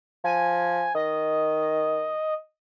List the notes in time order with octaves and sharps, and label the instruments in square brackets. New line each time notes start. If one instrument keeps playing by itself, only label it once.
[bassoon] F3 [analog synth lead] G#5
[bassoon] D#3 [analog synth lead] D#5